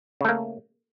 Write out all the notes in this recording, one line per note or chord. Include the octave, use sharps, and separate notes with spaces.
C#3 A3 A#3